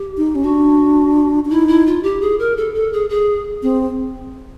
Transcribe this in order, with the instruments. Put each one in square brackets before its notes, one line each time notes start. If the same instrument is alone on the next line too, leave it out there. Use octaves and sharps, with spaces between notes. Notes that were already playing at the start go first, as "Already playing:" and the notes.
Already playing: [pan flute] G4
[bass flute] D#4
C#4
[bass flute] D4 [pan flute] F#4
[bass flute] D4
[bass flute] D#4 [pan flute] E4
[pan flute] E4
F4
G4
G#4
A#4
A4
A4
G#4
G#4
[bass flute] C4 [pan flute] G#4